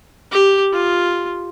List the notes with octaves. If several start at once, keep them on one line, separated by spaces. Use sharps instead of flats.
G4
F4